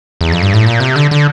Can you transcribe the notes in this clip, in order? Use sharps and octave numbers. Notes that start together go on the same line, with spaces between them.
E2
F2
G2
A2
A#2
C3
D3
D3